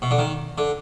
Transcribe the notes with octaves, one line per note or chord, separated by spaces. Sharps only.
B2
D3
D#3
D3